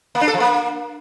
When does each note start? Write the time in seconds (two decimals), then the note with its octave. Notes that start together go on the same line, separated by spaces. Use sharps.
0.15 A#3
0.21 D4
0.28 A4
0.34 F3
0.40 A#3